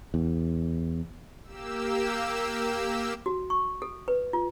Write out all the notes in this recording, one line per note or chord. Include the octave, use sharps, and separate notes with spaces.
E2
A#3 G4 E6
F#4
C#6
A4
B4
F4